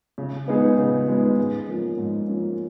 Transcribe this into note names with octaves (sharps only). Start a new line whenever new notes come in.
C#3
G#3 B3 D#4 G#4
C#3
G#3 B3 D#4 G#4
G#2
F3 A#3 C#4
G#2
F3 A#3 C#4